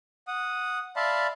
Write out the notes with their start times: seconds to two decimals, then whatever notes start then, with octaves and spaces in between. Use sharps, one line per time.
0.28 F#5 D#6
0.96 D5 E5 F5 A5 B5 C6